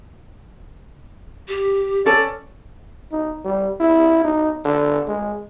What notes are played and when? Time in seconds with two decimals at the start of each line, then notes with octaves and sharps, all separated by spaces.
1.48 G4
2.06 C#4 A4 B4 D5
3.12 D#4
3.45 G3
3.80 E4
4.24 D#4
4.65 D3
5.08 G#3